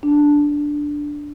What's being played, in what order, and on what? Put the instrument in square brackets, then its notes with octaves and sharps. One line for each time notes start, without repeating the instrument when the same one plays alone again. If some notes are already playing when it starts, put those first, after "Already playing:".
[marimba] D4